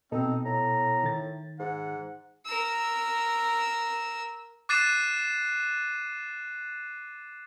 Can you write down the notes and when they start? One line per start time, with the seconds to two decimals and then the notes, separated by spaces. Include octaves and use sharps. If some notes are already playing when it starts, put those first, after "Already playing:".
0.12 B2 B3 C4 D#4 A4
0.45 A2 A#5
1.04 D#3 A6
1.60 G#2 F#5
2.46 A#4 E6
4.69 D6 F#6 A6 C7 D#7 E7